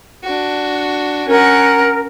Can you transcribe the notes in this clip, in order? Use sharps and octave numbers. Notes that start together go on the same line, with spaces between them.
D4 F#4
C#4 A#4 F#5